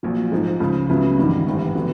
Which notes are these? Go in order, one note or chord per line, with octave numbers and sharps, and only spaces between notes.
A#1 A#2 F#3
G#2 F3 G#3
C#2 C#3 F3
C#2 C#3 F#3 B3 E4
A1 G2 D#3
A1 G#2 E3 G3
D3 F#3 B3